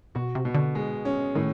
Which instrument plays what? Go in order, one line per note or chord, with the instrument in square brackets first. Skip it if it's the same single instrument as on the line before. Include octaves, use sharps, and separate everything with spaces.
[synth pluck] B2 [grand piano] F#4
[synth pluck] C3
[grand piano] B2
[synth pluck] D3
[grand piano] G#3
C#4
[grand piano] A2 [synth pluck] D#3